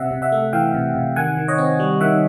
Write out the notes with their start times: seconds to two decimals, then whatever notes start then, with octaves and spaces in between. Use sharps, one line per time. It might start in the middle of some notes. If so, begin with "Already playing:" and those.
Already playing: C3 E5 F#5
0.11 C3
0.22 E5 F#5
0.32 A3
0.53 E3 F5 G5
0.74 C3
0.95 C3
1.16 D#3 F#5 G#5
1.37 D#3
1.48 C#5 D#5
1.58 C4
1.80 G3
2.01 D#3 E5 F#5